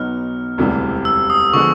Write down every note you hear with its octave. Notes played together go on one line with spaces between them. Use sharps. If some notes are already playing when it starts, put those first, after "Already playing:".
Already playing: B1 B2 F#3 B3 D#4 F6
E1 D2 C3 E3 G3
E6
D#6
D3 F3 G#3 B3 C#6